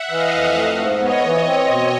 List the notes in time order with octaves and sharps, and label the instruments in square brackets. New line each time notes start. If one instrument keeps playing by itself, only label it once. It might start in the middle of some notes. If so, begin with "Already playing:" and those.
Already playing: [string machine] E5 F#5
[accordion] E3 [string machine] D#5 F5
[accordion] F2
A3
G#2
[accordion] B3 [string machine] C#5 D#5
[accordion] E3
C4
B2